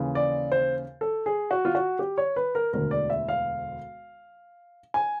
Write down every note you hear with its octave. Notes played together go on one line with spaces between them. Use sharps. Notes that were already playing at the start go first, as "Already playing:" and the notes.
Already playing: D#2 C#3 E3
D5
C5
A4
G#4
F#4
F4
F#4
G4
C#5
B4
A#4
E1 D2 D3 A#4
D5
E5
F5
G#5